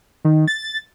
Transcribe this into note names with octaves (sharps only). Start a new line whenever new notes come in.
D#3
A6